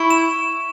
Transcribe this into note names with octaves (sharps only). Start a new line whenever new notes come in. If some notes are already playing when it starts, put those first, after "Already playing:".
Already playing: E4 C#6
E7